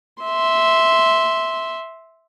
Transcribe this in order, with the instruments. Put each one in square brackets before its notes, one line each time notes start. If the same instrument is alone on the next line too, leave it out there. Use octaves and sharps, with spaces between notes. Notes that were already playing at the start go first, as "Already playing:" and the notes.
[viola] E5 C6